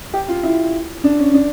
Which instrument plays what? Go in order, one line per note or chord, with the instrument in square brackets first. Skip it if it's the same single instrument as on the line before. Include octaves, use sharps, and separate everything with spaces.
[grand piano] G4
F4
E4
D4
C#4
D4